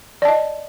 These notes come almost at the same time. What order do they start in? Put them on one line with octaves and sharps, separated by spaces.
D5 A5 D#5